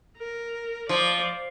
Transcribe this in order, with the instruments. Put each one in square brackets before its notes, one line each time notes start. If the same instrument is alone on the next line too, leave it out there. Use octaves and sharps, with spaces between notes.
[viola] A#4
[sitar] F3 [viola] D5